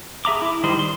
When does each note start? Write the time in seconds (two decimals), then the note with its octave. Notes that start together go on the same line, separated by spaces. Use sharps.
0.25 G#4 E5 A#5 D6
0.42 E4
0.63 D#3 G3 C5 D#5
0.79 C6